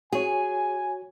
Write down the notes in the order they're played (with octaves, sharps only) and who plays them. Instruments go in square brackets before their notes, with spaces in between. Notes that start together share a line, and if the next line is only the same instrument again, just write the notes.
[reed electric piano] F#4 C#5 [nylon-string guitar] G#4 [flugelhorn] G#5